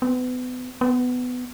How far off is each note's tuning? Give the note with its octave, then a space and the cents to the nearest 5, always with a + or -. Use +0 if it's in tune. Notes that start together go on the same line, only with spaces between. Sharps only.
B3 +30
B3 +15